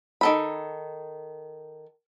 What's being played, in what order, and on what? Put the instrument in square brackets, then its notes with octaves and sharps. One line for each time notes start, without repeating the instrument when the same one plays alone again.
[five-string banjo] D#3 A4 B5